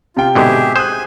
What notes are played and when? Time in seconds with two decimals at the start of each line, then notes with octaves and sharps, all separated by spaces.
0.17 C3 F4 G5
0.35 G#2 B2 D3 G4 G#4 E5
0.76 C5 G#5 D#6 F#6